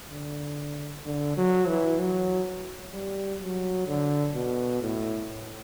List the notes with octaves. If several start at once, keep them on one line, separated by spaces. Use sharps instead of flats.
D3
D3
F#3
E3
F#3
G3
F#3
D3
B2
A2